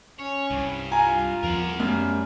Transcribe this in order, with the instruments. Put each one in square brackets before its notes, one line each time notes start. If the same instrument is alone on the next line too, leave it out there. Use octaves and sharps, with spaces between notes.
[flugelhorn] C#4 [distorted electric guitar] C#5
[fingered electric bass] C2 [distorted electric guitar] G2
[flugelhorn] F4 [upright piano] G#5 A#5
[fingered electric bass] E2 F3 [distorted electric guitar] A#4 F#5
[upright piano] F#2 F6 [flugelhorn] G3 [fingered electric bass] A3 B3